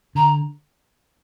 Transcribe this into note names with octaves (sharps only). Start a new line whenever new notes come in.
D3 A#5